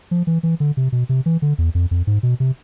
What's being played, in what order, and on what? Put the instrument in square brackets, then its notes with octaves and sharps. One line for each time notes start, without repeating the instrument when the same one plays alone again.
[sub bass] F3
E3
E3
D3
C3
B2
C3
E3
D3
E2
F2
F2
G#2
B2
C3